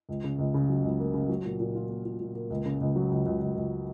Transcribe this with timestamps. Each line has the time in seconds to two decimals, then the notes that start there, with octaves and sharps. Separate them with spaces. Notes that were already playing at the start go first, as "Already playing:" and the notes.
0.09 C#2
0.24 C#3
0.39 C#2
0.54 C#3
0.69 F#3
0.84 C#2
0.99 A#3
1.14 C#3
1.29 F#3
1.45 A#2
1.60 A#2
1.75 F4
1.89 A#3
2.05 F4
2.20 A#2
2.35 A#3
2.50 C#2
2.65 C#3
2.81 C#2
2.96 F#3
3.11 C#2
3.26 C#2
3.41 C#2
3.56 C#2